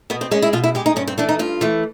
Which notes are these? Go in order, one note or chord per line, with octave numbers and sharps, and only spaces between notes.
B2 B3
C4
G#3 C#4
E4
B2 F4
E4
G#3 G4
D#4
G2 C#4
C4
E3 A3 D4
D#4
G2 F4
E3 A3